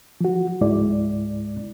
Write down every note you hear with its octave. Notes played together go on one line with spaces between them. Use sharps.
F3 F#4
C#2 G#2 G#3 E4 D5